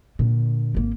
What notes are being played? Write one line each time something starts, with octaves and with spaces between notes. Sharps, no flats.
A#2 D3
G#1 A#3